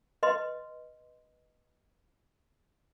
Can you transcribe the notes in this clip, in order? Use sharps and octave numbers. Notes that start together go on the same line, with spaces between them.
B4 D#5 C6